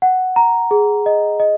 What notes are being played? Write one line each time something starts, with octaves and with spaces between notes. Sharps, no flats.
F#5
A#5
G#4
D#5
D#5